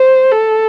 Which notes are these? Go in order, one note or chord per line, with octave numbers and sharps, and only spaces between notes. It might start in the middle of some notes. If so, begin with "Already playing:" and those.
Already playing: C5
A4